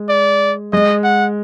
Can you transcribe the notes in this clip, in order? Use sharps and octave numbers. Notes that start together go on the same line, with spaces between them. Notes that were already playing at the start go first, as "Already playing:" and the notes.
Already playing: G#3
D5
G#3 D#5
F#5